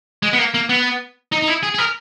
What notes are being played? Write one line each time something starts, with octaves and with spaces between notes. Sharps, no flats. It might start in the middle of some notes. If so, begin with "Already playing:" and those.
G#3
B3
A#3
A#3
B3
D#4
D#4
E4
G#4
G#4
A#4